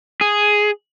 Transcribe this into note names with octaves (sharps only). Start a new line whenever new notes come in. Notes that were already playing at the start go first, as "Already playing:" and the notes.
G#4